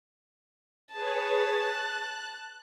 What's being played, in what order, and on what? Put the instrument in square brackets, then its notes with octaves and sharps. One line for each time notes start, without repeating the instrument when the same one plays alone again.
[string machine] G#4 B4 C#5 [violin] A5
[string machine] F#6